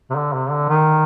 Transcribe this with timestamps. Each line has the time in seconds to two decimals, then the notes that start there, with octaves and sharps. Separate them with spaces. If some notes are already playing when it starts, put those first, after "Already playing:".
0.10 C3
0.15 D3
0.34 C3
0.51 D3
0.69 D#3